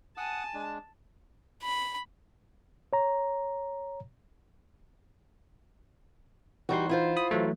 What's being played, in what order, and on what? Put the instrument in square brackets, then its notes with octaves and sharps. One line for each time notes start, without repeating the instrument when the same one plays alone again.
[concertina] F#5 D#6 [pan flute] G#5 [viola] A5
[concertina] G#3 D4
[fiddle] B5
[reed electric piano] C#5 A#5
[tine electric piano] E3 D#4 C6 [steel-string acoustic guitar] G3 F#4
[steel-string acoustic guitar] E4 F4 C5
[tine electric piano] B5 D#6
E3 F#3 A3